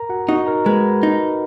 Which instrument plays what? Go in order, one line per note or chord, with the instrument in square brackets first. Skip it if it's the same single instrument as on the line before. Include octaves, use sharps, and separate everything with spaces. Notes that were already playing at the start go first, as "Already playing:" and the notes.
Already playing: [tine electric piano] A#4 A#5
F#4 F#5
[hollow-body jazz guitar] D#4 [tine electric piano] F#4 F#5
[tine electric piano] A#4 A#5
[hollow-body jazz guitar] G#3 [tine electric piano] B4 B5
[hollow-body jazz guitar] D#4